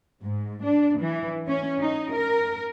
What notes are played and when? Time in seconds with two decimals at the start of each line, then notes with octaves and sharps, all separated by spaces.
0.22 G#2
0.64 D4
0.99 E3
1.47 C#4
1.80 D#4
2.13 A#4